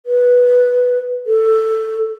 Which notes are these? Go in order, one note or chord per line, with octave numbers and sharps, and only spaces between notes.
B4
A4